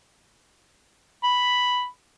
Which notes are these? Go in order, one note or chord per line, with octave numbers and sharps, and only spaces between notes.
B5